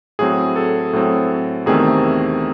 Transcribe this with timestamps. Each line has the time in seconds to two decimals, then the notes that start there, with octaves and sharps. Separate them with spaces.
0.19 A2 F#3 C4 G#4
0.56 A4
0.93 A2 F#3 C4
1.66 E2 C3 D#3 A3 C4 G#4